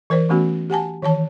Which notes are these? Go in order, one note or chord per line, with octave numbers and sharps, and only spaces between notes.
E3 A#4 C5 D5
E3 A3 B3 C#4 F#4
G4 F#5 G#5 A5
D#3 E3 C#5 A5